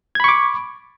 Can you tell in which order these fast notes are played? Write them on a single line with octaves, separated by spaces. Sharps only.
G#6 B5 C#6 D6